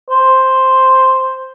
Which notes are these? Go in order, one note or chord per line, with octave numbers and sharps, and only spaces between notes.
C5